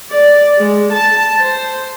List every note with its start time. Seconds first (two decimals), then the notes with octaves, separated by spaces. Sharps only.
0.11 D5
0.58 G#3
0.92 A5
1.40 C5